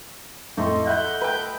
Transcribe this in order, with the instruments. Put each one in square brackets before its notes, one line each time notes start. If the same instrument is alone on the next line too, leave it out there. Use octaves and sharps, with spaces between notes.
[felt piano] F2 A2 [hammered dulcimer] A3 D#5 C6
[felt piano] E5 [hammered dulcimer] F#5 B5 [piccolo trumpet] G6
[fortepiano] B4 G5